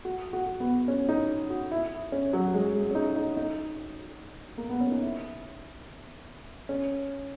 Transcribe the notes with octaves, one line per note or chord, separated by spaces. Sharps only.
F#4
F#4
B3
C#4
D#4
F#4
E4
C#4
F#3
G#3
G#3
C#4
D#4
D#4
D#4
A#3
B3
C#4
D#4
E4
C#4